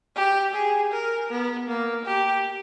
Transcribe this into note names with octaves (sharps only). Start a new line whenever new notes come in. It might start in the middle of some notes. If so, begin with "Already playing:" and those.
G4
G#4
A#4
B3
A#3
G4